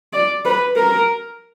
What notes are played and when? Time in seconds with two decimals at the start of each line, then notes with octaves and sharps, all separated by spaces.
0.13 D5
0.45 B4
0.76 A#4